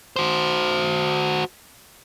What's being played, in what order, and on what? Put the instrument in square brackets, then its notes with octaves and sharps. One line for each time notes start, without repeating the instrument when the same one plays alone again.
[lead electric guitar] F#4 C5